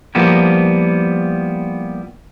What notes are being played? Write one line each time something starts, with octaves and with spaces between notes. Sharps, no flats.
F3 G3 A#3 B3 E4